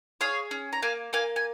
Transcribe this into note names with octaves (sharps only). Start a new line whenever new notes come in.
G#4 C#5 F5
C#4
A#5
A#3 F5 G#5
A#3 F5 G#5
G#5